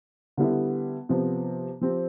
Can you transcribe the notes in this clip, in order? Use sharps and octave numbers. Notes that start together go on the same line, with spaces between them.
D3 G3 B3 E4
C3 F3 B3
F3 C4 G4